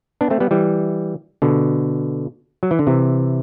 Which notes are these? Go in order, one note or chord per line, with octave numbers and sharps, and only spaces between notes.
B3 D4
A3 C4
G3 B3
E3 G3
B2 D3
F#3
E3
D3
C3 E3